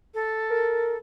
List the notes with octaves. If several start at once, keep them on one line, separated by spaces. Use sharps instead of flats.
A4
A#4